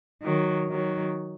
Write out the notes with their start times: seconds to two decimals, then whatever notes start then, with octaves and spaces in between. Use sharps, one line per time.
0.24 D#3 F#3
0.70 D#3 F#3